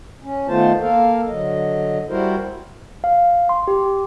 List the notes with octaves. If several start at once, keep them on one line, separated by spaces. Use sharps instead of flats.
C#4
D#3 A3 B3 F4 C5 A5
A#3 A4 A#4 F5
D3 F#3 D#5
G3 E4 F#4 A#4 C5
F5
C6
G4